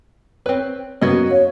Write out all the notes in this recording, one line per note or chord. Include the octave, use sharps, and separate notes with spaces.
C4 B4 C#5
F#2 F#3 B3 F#4 D#5 G#6
C#5 F5